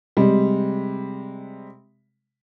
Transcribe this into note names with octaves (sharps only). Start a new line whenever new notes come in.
C3 G3 G#3